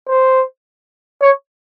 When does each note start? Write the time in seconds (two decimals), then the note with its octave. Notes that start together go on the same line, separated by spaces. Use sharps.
0.09 C5
1.22 C#5